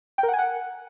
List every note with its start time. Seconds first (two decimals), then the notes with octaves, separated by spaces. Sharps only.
0.18 G5
0.23 A#4
0.28 F#5
0.33 G#5
0.39 F#5